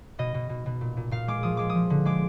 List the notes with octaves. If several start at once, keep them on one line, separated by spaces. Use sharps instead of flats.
B2 D#5
B2
B2
B2
A#2
A#2
A#2 F5
G#3 D6
F3 D#6
G#3 D6
D#6
F3
D3
G#3 D6